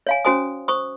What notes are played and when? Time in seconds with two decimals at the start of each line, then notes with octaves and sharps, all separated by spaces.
0.07 C#5 F5 G#5
0.25 C#4 F#4 C5 G#5 D#6
0.68 C5 C#6 D#6